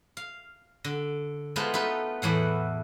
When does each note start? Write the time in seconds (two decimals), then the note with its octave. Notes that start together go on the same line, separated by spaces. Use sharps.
0.17 F5
0.84 D3
1.56 G#3 A3 B3 F4 B4 C5
1.74 A3 D#4 F4 A4 B4
2.22 E2 A2 E3 F#5